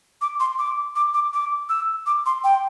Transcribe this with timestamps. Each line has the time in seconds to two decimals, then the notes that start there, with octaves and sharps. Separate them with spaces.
0.22 D6
0.40 C6
0.59 D6
0.96 D6
1.14 D6
1.33 D6
1.69 E6
2.06 D6
2.26 C6
2.44 G5